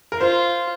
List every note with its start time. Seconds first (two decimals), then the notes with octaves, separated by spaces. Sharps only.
0.12 A#4
0.20 F4 C5